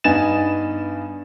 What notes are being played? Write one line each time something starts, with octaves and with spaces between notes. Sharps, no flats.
G2 B3 D#4 G#5 A6 E7